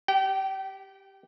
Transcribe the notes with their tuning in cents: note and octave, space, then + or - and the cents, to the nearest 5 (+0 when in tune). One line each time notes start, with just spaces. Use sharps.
G4 +0 G5 -30